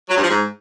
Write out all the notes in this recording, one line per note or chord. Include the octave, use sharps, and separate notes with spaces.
F#3
G2
F3
G#2